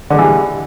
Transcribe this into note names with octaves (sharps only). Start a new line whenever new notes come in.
D3 E3 G3 G#3